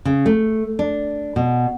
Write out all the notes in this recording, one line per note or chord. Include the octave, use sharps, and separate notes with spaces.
C#3
A3
D4
B2